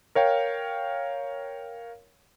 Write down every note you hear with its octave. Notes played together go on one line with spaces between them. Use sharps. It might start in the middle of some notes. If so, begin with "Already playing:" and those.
A#4 C#5 F5 G5